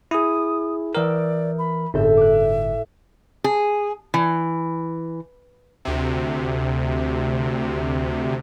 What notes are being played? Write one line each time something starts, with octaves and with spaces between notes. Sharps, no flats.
E4 G#4 D#6
E3 A#4 D5 E5 G5 D#6
B5
G1 A2 A4 E5 G6
D6 F#6
G#4
E3
D2 C3